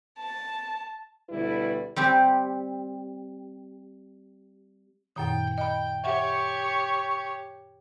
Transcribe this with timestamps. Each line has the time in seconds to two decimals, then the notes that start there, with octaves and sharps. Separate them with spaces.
0.19 A5
1.30 D2 B2 D3 G3 E4 B4
1.96 G3 C4 G4
5.16 F#2 A#2 D#3 G5
5.58 D#5 G5 B5
6.04 G4 C#5 E5 F#5 C#6